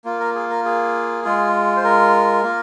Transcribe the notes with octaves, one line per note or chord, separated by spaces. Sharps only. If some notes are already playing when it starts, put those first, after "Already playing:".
A#3 F4
A#4
G#4
A#4
G#4
G#3 F4
C5
A#4
A#3 F4